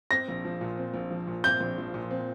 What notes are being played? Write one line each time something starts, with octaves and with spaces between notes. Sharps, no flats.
C4 A#6
A#1
F3
A#2
C4
A#1
F3
A#2
C4 G6
A#1
F3
A#2
C4